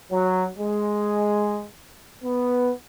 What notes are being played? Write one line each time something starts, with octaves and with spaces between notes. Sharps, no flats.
F#3
G#3
B3